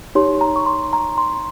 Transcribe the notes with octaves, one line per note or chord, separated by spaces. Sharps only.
D#4 G4 C#5 C6
A#5
C#6
C6
A#5
C6